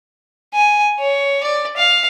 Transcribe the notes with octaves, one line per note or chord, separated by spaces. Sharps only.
G#5
C#5
D5
F5